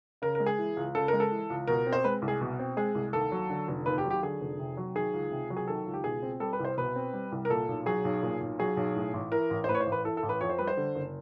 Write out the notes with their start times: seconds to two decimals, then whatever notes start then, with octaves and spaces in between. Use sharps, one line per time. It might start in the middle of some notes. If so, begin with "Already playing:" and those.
0.22 C#3 A#4
0.35 A#4
0.40 G#3
0.46 G#4
0.58 E3
0.77 C#2
0.95 C#3 A4
1.08 G#3 A#4
1.20 A4
1.31 E3
1.50 C#2
1.67 B2 A#4
1.86 C4
1.93 C5
2.04 G#3 B4
2.22 C2
2.28 G#4
2.41 B2
2.59 C4
2.77 G#3 G#4
2.95 C2
3.13 D#2 A4
3.32 F#3
3.50 D3
3.68 F1
3.86 D#2 B4
3.98 G4
4.05 F#3
4.10 G4
4.23 D3 G#4
4.41 F1
4.59 C3
4.77 F#3
4.96 D#3 G#4
5.14 C#2
5.31 C3
5.50 F#3
5.57 G#4
5.67 D#3 A4
5.87 C#2
5.94 G4
6.04 B2 G#4
6.23 C4
6.40 G3 A4
6.53 B4
6.59 C2
6.65 C5
6.77 B2 B4
6.96 C4
7.13 G3
7.32 C2
7.45 A#4
7.50 A#2 A4
7.68 B1
7.86 F#3 G#4
8.05 B1
8.23 A#2
8.41 B1
8.59 F#3 G#4
8.77 B1
8.96 A2
9.14 A1
9.32 E3 A#4
9.50 A1
9.64 C5
9.68 A2 B4
9.75 C#5
9.80 C5
9.87 A1
9.92 B4
10.05 E3 A4
10.17 A4
10.23 A1
10.29 B4
10.41 F2 C#5
10.49 C5
10.58 G3 B4
10.68 C5
10.77 D3
10.95 F#1